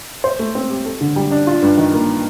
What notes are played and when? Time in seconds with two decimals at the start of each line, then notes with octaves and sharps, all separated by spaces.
0.24 C5
0.39 A3
0.55 C4
0.70 G4
0.86 A4
1.01 D3
1.16 G3
1.31 D4
1.47 F4
1.62 G2
1.77 D#3
1.93 A#3